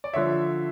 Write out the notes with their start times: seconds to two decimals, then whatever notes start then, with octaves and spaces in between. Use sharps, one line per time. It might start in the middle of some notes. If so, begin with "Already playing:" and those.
0.04 D5
0.13 D3 F3 C#5 E5